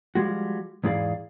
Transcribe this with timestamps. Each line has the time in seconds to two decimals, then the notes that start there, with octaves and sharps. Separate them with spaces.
0.15 F3 G3 G#3 F#4
0.84 E2 G#2 E3 G#4 D5 F5